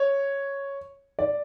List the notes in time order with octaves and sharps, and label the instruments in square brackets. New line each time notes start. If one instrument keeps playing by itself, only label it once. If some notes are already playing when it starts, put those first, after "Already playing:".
Already playing: [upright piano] C#5
D5